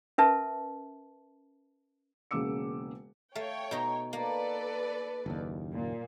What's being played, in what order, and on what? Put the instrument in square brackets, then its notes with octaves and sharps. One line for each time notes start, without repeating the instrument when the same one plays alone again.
[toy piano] C#4 A#4 B4 E5 A5
[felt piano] E1 C#3 A#3 D6 E6 C#7
[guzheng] A3 F5 [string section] C#5 G5
[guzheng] B2 D#4 A#5
[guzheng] A#3 [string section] A4 B4 D5
[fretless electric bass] F#1 D#2
[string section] A#2